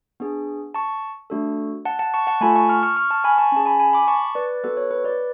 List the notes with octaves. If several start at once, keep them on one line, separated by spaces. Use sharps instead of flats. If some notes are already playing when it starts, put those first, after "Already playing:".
B3 D4 G#4
A5 C#6
A3 D4 F#4 A4
F#5 A5
F#5 A5
A5 C#6
F#5 A5
A3 F4 A4 G#5 B5
A5 C#6
C#6 F6
C#6 F6
C#6 F6
A5 C#6
G#5 B5
A5 C#6
C#4 G#4 A5
G#5 B5
G#5 B5
B5 D6
A5 C#6
B4 D5
B3 F#4 A4 B4
C#5
B4
B4 D5